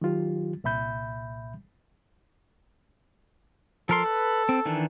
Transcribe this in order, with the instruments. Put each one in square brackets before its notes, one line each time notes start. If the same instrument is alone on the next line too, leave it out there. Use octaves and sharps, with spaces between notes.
[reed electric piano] D#3 F#3 F4 G4
C2 A#2 E5 B5 G6
[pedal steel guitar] F3 A#4 C6 [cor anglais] A4
[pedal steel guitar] B4
C4
D#3 E3 D4